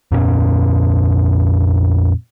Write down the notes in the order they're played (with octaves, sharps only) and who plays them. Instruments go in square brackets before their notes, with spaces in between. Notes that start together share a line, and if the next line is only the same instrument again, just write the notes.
[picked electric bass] F2 A#2 B3 C#4